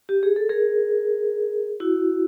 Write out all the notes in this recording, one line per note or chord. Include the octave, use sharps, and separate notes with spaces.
G4
G#4
A4
G#4 A#4
E4 F#4